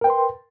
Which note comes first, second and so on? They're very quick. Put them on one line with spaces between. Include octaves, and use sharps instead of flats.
A#4 G5 B4 C6